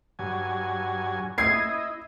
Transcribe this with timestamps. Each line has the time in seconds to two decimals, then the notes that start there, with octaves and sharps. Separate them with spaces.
0.19 G2 F#3 G#5
1.38 E4 D#5 G#6 C7